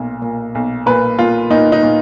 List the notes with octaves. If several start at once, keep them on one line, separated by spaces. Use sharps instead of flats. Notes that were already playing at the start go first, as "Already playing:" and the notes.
Already playing: B1 A#2
A#2
B1
A#2 B4
A#2 F4
A#2 D#4
D#4
A#2